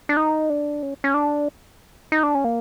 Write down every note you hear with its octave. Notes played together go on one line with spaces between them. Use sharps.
D4
D#4
D4
C#4
C#4
D4
D#4
D4
C#4
A#3